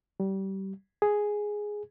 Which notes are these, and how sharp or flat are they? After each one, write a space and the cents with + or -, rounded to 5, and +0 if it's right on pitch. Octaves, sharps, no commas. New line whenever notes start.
G3 -25
G#4 +0